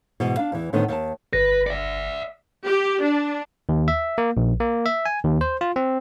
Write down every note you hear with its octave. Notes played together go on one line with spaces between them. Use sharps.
G#2 B2 E3
D4 F5
E2 E3
A2 D3 D#3 B3 C4 D#4
D#2 A5
G1 B4 A#6
D5 E5
G4
D4
D#2
E5
A#3
A#1
A#3
E5
G#5
D#2
C5
F4
C4